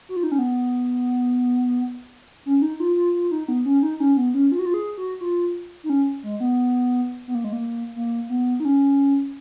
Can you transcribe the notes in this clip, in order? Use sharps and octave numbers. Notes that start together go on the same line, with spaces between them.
F#4
F4
D#4
C#4
B3
C#4
C#4
D#4
F4
F4
F4
D#4
B3
C#4
D#4
C#4
B3
C#4
F4
F#4
F4
G#4
F#4
F4
D#4
C#4
G#3
B3
B3
A#3
G#3
A#3
A#3
B3
D#4
C#4